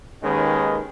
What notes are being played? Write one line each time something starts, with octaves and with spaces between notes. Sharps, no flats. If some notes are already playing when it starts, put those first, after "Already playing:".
D#2 D#3 G#3 C#4 B4